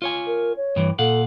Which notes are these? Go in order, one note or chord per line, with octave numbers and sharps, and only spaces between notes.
F4 C#5 G#5
A#4
C#5
G2 E3
A#2 A4 F5 F#5